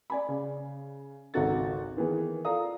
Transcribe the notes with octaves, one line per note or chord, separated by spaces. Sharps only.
D5 G#5 B5
C#3
G#1 C#2 D#4 F#4 A4 A6
D#3 E3 B3 G#4
F4 A4 D5 F5 A#5 D#6